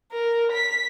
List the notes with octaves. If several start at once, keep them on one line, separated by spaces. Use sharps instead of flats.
A#4
B6